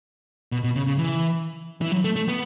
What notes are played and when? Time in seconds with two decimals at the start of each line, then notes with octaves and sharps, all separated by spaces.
0.52 B2
0.64 B2
0.76 C#3
0.87 C#3
0.98 E3
1.81 E3
1.92 F#3
2.04 A3
2.16 A3
2.28 B3